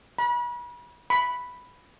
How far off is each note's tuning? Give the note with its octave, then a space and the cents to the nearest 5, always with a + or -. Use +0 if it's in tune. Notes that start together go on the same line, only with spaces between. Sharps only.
B5 -35
B5 +0